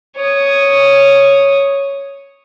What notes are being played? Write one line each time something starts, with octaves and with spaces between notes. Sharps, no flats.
C#5 D#6